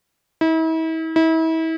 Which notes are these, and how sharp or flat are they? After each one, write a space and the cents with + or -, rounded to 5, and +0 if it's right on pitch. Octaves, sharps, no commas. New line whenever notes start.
E4 -40
E4 -35